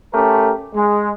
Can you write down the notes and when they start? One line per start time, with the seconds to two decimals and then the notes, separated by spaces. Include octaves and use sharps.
0.13 A3 C#4 G4 A#4
0.74 G#3